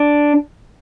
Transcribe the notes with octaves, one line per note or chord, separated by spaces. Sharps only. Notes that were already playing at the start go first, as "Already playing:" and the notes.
Already playing: D4